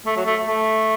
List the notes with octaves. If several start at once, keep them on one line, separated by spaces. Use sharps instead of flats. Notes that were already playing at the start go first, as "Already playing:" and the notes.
A3
F#3
A3
A3